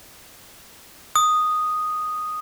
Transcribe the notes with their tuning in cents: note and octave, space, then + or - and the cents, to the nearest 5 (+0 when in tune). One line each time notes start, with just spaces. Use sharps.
D#6 -5